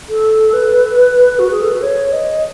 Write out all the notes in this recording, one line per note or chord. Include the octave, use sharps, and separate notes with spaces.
A4
B4
F#4
G#4
A4
B4
C#5
D#5